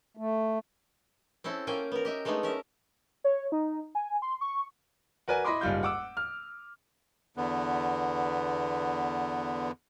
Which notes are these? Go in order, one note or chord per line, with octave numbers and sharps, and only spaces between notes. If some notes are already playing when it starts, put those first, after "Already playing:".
A3
C4 C#4 E4 A4
A#3 C#4 F4 G5 G#5
B3 A#4
G4 D#5 E5
G#3 A3 B3 D4 D#4 G#4
C#4 A#4 E5
C#5
D#4
G#5
C6
C#6
F#4 A#4 B4 D5 G#5
E4 D#5 B5 C6 D6
F#1 G#2 G3 F4 G6
F#5 D6 E6
F6
E2 D3 B3